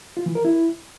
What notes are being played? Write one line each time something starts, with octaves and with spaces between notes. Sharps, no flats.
F4
E3
A#4
E4